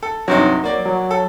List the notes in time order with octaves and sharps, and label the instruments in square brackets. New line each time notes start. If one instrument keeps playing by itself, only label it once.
[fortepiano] A4
[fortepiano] G2 C3 D#4 [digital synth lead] F#3
[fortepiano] A#3 D5
[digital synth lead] F#3
[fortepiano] A4